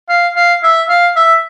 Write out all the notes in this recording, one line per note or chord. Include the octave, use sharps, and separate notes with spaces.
F5
F5
E5
F5
E5